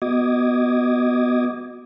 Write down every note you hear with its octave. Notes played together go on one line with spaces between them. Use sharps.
B3 F#4 D#5 D6 D#6 G#6